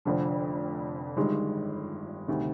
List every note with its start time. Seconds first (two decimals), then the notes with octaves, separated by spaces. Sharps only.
0.05 F1 F2 D3 F3
1.16 G1 G2 D#3 G#3
2.28 D2 C3 D#3